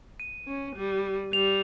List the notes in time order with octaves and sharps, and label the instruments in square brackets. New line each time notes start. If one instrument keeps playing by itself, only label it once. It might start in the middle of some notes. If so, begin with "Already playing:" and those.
[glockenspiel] D#7
[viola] C#4
G3
[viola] G3 [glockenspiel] F7